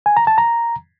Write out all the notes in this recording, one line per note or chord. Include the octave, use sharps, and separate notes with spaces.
G#5
A#5
A5
A#5